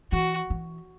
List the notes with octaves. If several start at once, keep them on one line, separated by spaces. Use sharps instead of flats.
E3 F#4
E3